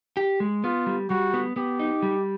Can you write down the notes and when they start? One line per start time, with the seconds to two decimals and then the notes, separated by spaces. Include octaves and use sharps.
0.17 G4
0.40 G#3
0.64 B3 F4
0.86 G3
1.10 G3 F#4
1.34 B3
1.56 B3 G4
1.79 D#4
2.03 G3